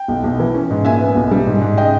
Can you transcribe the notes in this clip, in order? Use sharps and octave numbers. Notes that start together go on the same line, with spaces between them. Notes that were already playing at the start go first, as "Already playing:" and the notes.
Already playing: G5
B1
B1
E3
C#4
G#2
A#2 E5 G#5
B3
B1
G3
G#2
G#2
C#3 D#5 G5